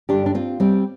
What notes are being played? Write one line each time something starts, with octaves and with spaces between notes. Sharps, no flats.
G2 D3 D4 G4
D4
C4 F4
G3 C4